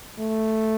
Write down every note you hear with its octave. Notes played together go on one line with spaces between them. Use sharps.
A3